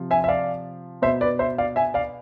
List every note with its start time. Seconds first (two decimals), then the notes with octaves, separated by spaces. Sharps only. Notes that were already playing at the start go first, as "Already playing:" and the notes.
Already playing: C3 F3
0.11 E5 G#5
0.24 E5
0.28 D5 F5
1.02 B2 C5 E5
1.21 B4 D5
1.39 C5 E5
1.58 D5 F5
1.76 E5 G#5
1.94 D5 F5